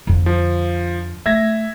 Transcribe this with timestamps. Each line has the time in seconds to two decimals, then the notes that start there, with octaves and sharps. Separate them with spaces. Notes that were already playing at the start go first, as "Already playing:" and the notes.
0.07 F2 D3
0.26 F3
1.26 A3 E5 G#6 A#6